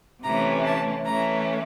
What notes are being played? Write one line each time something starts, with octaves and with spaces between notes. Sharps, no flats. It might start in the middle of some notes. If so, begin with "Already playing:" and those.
C3 E3 A3 C#4 A#5
A5
E3 A3 C#4 A#5